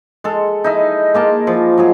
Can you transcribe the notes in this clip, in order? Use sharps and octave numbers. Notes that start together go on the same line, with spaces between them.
G#3 A4
D#4 E4 D#5
G#3 A#3 A5
F3
F#3 G#3 G#4